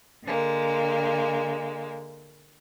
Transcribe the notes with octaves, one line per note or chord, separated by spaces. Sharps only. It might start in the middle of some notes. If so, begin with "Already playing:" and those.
D3 G#3 A#3